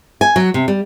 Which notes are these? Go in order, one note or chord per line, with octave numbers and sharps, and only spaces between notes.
G#5
F#3
C3
G3